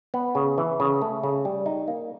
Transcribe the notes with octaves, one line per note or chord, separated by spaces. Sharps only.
B3
C#3
E3
C#3
A3
C#3
G3
D#4
A#3